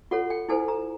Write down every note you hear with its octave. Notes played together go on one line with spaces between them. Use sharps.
F4 A4 C#5 F#5
G5
E4 A4 C5 G#5
A#5